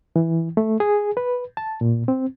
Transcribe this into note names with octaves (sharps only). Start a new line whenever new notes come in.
E3
A3
G#4
B4
A5
A#2
C4